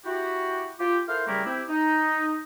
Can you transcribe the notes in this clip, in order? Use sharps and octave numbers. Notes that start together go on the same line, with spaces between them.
E4 F#4 G4
F4 G4
E4 A4 A#4 C5 F5
C#3 G3 A3 E4 G4 A#4
C4 E4 G4
D#4